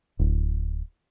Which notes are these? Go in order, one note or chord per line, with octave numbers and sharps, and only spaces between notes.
D1